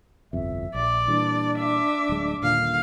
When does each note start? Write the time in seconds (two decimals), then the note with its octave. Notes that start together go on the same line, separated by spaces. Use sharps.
0.33 G1 C2 F2 E5
0.75 A#1 D5
1.08 A#2 E3 G3 D4
1.59 E5 D6
2.09 D1 G#3
2.42 D#1 A#2 D3 F5